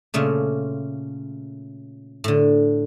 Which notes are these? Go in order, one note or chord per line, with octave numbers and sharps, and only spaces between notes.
A#2 C#3 A3 A#3
A2 D3